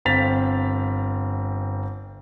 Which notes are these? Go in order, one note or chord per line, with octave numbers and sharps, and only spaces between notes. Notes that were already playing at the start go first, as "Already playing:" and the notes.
G1 C4 F5 A6 B6 F7